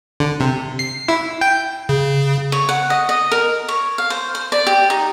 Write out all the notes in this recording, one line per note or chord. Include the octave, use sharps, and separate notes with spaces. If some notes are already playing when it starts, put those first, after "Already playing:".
D3
C3
C7
E4
G5
C#3
C#5
F#5
D#5
D#5
A#4
C#5
F5
C5
C5
D5
G4
D#4